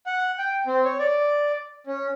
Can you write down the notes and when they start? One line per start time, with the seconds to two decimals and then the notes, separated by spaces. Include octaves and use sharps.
0.06 F#5
0.39 G5
0.67 C4
0.85 C#5
0.99 D5
1.87 C#4